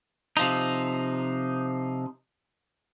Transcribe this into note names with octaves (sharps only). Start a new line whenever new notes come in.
C3 F3 D#4